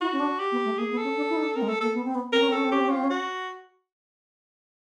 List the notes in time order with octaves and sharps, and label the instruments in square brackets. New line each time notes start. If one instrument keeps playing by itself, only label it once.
[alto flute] E4 [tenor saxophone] F#4
[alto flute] C#4
D4
[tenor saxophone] G4
[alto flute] B3
A3
[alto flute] A#3 [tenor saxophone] G#4
[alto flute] B3
[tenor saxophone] A4
[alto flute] C#4
D4
E4
D#4
D4
[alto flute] C4 [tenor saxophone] A#4
[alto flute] G#3
[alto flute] A3 [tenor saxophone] A4
[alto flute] A#3 [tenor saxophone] A4
[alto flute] B3
C4
B3
[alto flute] C4 [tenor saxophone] A#4
[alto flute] C#4
C4
[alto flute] C#4 [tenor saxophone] A4
[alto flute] C4
[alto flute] C#4 [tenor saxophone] G4
[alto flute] C4
[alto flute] C#4 [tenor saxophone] F4
[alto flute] C4
C#4
[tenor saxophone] F#4